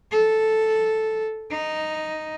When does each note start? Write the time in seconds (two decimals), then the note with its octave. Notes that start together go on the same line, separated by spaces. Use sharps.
0.11 A4
1.50 D#4